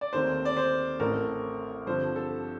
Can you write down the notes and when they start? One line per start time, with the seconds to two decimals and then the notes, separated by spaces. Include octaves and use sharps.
0.01 D5
0.13 D#2 D#3 A3 C4 C5
0.45 D5
0.57 C5
0.99 A1 A2 A3 C4 A#4
1.86 G2 D3 F3 C4 C5
2.16 A4